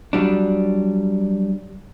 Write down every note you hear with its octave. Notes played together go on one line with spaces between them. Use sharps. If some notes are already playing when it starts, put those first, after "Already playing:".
F#3 G3 D4